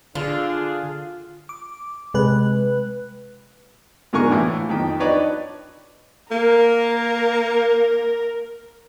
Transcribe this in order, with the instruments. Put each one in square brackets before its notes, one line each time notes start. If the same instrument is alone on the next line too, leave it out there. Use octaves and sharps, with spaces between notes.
[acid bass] D3 [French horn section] D4 G#4 [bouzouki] F4
[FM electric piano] D6
[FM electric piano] C3 B4 F#6 [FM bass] G#3
[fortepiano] G#2 D3 A#4 G#5 C#6
A2 E3 A#3
F2 D#3 G5
D4 D#4 B4 C#5 D5
[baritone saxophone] A#3 [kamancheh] A#4